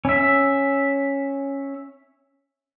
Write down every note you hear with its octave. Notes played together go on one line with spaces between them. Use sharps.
C#4 E5